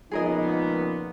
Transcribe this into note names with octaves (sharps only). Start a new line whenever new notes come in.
C#2 A#2 F3 B3 D#4 G#4 A#4 D#5